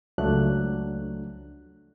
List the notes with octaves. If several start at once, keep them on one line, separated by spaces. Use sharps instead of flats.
C#2 F3 F#3 A3 D4 F#6